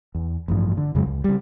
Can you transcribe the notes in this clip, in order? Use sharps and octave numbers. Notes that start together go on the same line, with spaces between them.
E2
A1 G2 F3
D3
F2 C#3 F#3 G#3
C#2
C#3 G3